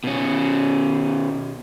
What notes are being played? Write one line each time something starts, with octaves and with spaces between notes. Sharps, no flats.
B2 C#4